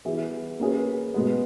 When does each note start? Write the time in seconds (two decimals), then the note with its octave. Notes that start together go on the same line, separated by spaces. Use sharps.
0.05 E3 B3 E4 G#4
0.60 A#3 C#4 G#4 B4
1.14 B2 G#3 B3